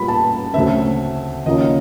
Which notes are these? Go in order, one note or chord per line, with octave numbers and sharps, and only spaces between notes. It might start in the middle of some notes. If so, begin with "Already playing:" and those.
Already playing: A#2 G3 B3 B5
A5
D2 C#3 F#3 A3 C4 E5
D#2 C#3 F3 A#3 C#4 D#5